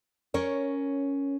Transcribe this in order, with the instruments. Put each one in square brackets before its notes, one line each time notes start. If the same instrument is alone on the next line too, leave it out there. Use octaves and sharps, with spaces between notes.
[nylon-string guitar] C#4 A#4 C#5